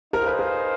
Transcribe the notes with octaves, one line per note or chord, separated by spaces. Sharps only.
D#4 G#4 A#4 C5 F5
B4
A#4